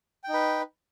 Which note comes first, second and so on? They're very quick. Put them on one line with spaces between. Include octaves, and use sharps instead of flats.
G5 D#4 B4